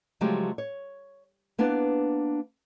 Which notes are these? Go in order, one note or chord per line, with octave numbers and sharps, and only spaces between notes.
C#3 F3 F#3 G#3 A3 G4
C#5
A#3 B3 D4 E4 B4